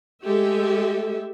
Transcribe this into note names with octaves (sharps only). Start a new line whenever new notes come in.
G#3 A3 G4 A4 E5